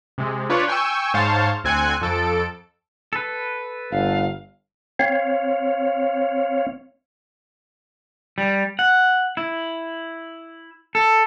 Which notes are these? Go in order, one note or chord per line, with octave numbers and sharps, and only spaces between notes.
C3 G#3
D4 F4 B4 C#5 D5
G5 G#5 C#6 E6
G#2 C5 C#5 F5 A5
D2 C4 G#5 F#6 G#6 C#7
F2 A4 D7
A4 B4
G1 F5
C4 C#5 F5
G3
F#5
E4
A4